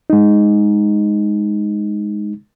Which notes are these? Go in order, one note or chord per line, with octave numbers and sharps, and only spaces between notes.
G#3 D#4